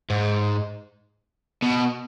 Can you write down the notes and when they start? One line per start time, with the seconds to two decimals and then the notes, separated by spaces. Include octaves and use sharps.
0.10 G#2
1.62 B2